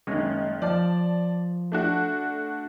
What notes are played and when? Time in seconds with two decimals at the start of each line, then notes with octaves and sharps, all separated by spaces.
0.07 F#1 D#3 G#3 C#4
0.62 F3 D5 A5
1.72 A3 D4 F#4